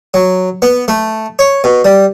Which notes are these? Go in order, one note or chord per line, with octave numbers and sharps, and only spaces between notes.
F#3
B3
A3
C#5
B2
G3